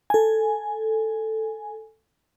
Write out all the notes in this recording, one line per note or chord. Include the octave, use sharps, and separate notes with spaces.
A4 G#5